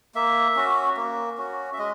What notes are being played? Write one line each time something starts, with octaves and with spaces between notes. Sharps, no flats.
A#3 E5
C#4 F#4
A#3
C#4 F#4
E5
G#3 D#5